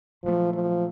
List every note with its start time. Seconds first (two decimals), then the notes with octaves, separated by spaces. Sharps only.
0.24 A#2 F3 F#3 A3
0.54 F3